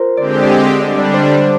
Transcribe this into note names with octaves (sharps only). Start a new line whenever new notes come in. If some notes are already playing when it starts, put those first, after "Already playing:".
Already playing: F4 A#4 C5
D3 G#3 C4 G4 D5
D5
D#5
D3 G3 D4 D#5
D5
C5